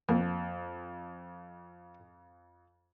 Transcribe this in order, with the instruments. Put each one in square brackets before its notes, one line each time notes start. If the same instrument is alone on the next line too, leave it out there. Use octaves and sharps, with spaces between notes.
[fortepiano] F2 [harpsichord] A#3